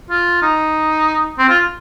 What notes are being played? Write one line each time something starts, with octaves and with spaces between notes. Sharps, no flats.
F4
D#4
C4
F4